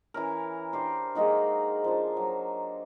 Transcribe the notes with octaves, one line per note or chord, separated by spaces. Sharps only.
E3 C#4 A#4
D4 G4 C5
G#3 A#3 D#4 F#4
F3 D4
F#3